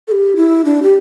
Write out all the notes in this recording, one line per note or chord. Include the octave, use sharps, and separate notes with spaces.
A4
G4
E4
D4
G4